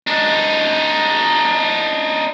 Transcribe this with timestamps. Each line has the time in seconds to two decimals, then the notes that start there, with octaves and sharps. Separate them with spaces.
0.07 D4 D#4